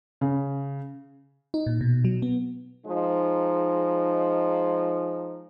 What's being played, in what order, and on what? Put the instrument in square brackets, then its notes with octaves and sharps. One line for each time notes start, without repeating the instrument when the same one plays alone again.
[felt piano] C#3
[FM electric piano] D#4
A#2
B2
F#3
B3
[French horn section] F3 G#3 D#4